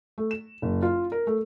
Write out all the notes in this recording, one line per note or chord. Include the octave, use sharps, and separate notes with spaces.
A3
E7
F#1
F4
A#4
A3